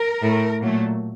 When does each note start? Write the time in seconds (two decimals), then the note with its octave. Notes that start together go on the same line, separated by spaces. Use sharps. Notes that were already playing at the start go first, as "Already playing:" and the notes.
Already playing: A#4
0.21 A2 A3
0.61 A#2 F#3 A3